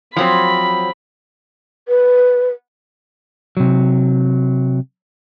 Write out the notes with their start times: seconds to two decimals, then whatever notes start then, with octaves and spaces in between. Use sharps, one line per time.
0.16 F3 F#3 C4 B5
1.88 B4
3.57 C3 F#3